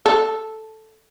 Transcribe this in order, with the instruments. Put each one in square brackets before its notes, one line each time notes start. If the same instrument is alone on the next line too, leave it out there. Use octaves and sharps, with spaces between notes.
[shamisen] A4